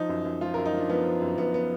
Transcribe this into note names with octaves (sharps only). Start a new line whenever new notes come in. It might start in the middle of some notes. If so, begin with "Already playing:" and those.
Already playing: F3 D#4
F#2
F#2
F3 F4
F#2 A#4
D#4
F3 D4
F3 B3
F3
F#2
F#2 B3
B3